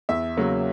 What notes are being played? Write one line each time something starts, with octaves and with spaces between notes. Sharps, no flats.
E2 E5
C#3 F#3 A#3